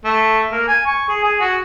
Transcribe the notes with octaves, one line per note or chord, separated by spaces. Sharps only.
A3
A#3
G#5
C#6
G#4
G#4
F#4